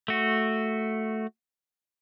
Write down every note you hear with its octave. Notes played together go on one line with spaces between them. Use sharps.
A3 F#4